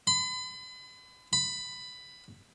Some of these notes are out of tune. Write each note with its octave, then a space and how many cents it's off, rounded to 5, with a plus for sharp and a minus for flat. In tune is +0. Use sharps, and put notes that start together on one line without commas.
B5 +40
B5 +15